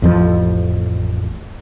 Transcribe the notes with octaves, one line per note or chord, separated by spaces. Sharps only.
A1 F2 F3